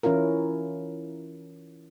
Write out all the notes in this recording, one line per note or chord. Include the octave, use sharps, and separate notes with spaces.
E3 C#4 E4 F4 A#4